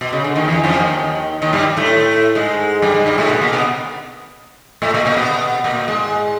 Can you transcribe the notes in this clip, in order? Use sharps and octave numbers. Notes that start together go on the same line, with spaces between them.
B2
C#3
D3
D#2 D#3
E2 E3
F2 F3
D#2 D#3
D#2 D#3
G2 G3
A2 A3
G#2 G#3
G2 G3
G#2 G#3
G2 G3
A2 A3
B2 B3
A#2 A#3
B2 B3
A2 A3
A#2 A#3
A#2 A#3
B2 B3
A#2 A#3
G#2 G#3